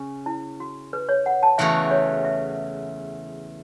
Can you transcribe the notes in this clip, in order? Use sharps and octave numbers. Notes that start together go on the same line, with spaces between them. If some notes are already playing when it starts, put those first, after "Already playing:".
Already playing: C#3 C#4
E4
F#4
B4
C#5
F#5
A5
E2 C#3 E3 A3 F#4 E5
C#5
E5